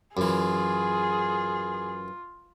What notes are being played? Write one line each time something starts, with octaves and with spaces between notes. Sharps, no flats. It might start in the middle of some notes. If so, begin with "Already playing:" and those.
F#2 E3 F4 G#4